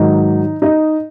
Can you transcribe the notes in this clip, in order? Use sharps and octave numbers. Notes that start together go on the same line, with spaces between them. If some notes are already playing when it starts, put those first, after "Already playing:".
Already playing: G#2 D#3 F#3 D#4 D#5
D#4 D#5